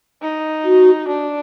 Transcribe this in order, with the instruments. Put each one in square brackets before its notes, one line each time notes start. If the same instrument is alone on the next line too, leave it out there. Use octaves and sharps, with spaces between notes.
[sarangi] D#4
[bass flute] F#4
[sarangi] D4